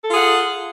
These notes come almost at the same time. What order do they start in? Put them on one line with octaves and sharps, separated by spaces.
A4 F4 G#4 F#5